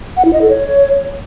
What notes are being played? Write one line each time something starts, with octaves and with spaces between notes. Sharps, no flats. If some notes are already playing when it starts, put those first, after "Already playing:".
F#5
E4
D#5
A4
C#5